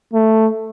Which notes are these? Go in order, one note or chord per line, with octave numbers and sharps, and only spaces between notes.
A3